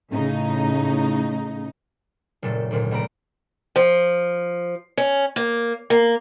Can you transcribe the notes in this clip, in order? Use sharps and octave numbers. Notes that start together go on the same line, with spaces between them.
A2 C#3 D#4
F#1 A#2 A3 A4
G#1 D2 A#2
C#2 A3 B4 A#5 D7
F3
C#4
A#3
A#3